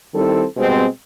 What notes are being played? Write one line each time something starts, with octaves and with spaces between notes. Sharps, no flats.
D#3 G3 C4 E4 A4
B2 G3 G#3 C4